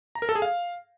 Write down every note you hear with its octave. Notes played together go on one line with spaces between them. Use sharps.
A#5
A#4
A4
G#4
F5